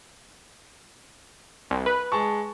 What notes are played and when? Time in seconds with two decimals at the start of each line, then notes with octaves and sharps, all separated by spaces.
1.70 C2
1.86 B4
2.12 G#3 A5 C#6